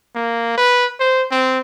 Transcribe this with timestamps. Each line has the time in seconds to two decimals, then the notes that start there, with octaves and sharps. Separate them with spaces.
0.15 A#3
0.58 B4
1.00 C5
1.32 C4